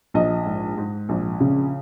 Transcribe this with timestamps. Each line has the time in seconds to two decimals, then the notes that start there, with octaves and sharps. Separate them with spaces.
0.14 A#1 D#5
0.46 G#2
0.77 G#2
1.09 A#1
1.40 C#3